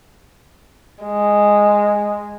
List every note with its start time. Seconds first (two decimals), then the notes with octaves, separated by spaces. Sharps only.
1.03 G#3